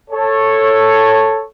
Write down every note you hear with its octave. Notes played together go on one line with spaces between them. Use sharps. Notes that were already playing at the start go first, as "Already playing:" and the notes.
A4 C#5